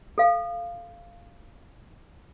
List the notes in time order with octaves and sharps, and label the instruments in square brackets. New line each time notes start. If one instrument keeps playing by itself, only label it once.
[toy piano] A4 F5